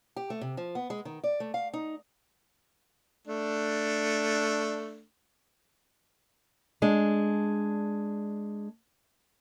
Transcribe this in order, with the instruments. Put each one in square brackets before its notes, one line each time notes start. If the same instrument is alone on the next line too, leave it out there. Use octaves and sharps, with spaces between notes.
[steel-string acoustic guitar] G4
A3
C3
F3
B3
G#3
D#3
D5
A3
F5
D#4
[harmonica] A3 D4
[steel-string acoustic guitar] G#3 D4